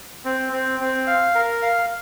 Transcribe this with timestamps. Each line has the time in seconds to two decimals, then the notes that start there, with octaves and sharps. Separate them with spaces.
0.25 C4
0.53 C4
0.80 C4
1.07 F5
1.35 A#4
1.62 F5